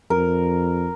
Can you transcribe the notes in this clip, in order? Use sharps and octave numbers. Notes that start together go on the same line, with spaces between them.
F2 A#4